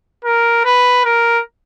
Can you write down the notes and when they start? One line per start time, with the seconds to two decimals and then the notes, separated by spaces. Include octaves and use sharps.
0.25 A#4
0.65 B4
1.05 A#4